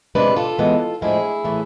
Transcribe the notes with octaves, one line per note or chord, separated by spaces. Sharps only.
C3 E3 G#3 D4 B4 D5
F4 A4
E3 G#3 B3
A2 F3 G#3 D4 E4 G#4
A2 E3 A3